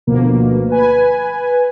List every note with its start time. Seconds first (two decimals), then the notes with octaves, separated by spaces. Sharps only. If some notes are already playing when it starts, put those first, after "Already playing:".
0.07 D2 B2 F3 A#3
0.69 B4 G#5